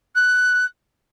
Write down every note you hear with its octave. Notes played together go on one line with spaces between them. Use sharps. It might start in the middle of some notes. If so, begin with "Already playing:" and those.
F#6